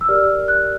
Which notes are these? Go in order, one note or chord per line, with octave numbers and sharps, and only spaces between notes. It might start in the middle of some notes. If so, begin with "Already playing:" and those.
E6
G4 A#4 D5 F6
F#6